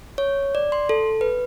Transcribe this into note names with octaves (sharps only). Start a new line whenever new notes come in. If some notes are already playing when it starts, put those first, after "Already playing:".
C#5
D5
C6
A4
B4